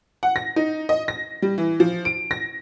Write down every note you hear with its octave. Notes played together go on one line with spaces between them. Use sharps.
F#5
A#6
D#4
D#5
A#6
G3
E3
F3
D7
A#6